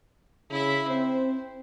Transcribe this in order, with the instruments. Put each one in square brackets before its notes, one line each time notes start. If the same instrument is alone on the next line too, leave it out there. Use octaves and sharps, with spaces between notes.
[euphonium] C#3 [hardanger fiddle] E4 E5
[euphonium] C4 [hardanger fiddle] C5